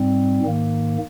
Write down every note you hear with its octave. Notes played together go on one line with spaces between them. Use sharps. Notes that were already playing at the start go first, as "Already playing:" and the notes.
Already playing: G#2 G3 C4
G#2 D#3 A#3